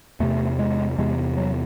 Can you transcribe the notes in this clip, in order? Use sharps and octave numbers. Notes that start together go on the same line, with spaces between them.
E2 C3 A3
G#3
E2 C3 G#3
F#3